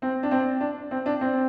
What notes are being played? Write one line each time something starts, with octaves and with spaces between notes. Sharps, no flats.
C4
D4
C4
D4
C4
D4
C4